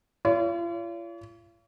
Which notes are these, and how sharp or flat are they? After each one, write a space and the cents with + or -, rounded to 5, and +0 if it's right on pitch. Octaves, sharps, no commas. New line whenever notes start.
F4 -40 C#5 +45